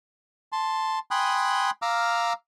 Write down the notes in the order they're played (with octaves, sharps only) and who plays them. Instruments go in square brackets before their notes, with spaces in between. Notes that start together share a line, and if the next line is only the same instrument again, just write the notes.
[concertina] A5 C6
G5 G#5 B5 C6 D#6 F#6
F5 A#5 D6 E6 F6